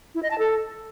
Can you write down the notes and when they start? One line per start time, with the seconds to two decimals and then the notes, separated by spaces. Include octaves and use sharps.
0.15 E4
0.23 D#5
0.31 A5
0.39 A4